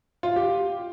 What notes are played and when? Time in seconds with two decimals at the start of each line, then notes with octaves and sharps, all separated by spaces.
0.23 F4
0.36 G4